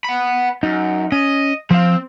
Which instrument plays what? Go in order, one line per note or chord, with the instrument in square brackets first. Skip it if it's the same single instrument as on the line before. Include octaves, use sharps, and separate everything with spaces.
[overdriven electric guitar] F#5 B5
[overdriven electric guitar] F#2 [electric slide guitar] D#4
[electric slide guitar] C#4 [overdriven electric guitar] D#5
[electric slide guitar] F3 F5 [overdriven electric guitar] C4